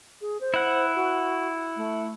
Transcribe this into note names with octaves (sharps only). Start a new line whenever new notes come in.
G#4
C5
E4 F#5
F#4
A3